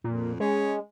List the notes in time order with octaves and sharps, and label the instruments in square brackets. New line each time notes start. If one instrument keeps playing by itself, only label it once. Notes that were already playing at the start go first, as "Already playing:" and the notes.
[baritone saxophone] F2 [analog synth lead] A#2
[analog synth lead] G#3 [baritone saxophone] C#4